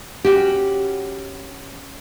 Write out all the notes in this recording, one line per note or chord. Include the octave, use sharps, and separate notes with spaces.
C#4 F#4 G4